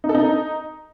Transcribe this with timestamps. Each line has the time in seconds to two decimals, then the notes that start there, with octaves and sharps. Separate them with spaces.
0.04 D#4
0.09 A4
0.15 D#4